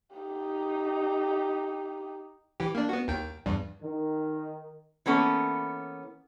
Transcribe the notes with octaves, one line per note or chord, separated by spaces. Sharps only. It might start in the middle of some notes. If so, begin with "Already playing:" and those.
D#4 G4
E3 G4
A#3 D4
B3 F#4
D#2 D#3 G5
E2 G2
D#3
E3 A#3 B3 C#4 A4